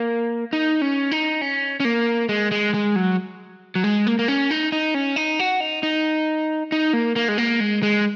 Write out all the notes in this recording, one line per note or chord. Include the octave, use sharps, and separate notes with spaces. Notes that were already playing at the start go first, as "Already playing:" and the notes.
Already playing: A#3
D#4
C#4
D#4
C#4
C#4
A#3
G#3
G#3
G#3
F#3
F#3
G#3
A#3
A#3
C#4
D#4
D#4
C#4
D#4
F#4
D#4
D#4
D#4
A#3
A#3
G#3
A#3
G#3
G#3